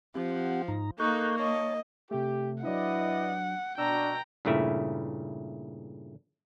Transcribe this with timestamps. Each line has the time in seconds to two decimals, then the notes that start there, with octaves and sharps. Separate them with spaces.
0.15 F3 C4 G4 F#5
0.68 G#2 D#4 A#5
0.99 A#3 D#4 A4 C#6 F#6 G6
1.39 C#5 D#5 A5
2.11 C3 A3 G4
2.64 F#3 D4 E4 B4 D5 D#5 F#5
3.78 B2 D4 F#4 G5 A#5 E6
4.45 G2 A#2 C#3 A3 E4